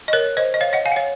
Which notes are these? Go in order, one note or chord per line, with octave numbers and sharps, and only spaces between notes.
D#5
A#4 C#5
C5 D#5
D#5
C#5 F5
D#5 F#5
F5 G#5
F#5
C#5 F5